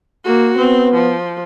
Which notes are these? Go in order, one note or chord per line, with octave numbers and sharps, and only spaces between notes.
A#3 F#4
B3 C4
F3